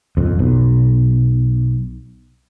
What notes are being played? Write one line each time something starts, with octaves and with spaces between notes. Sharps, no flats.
D#1 F2
B1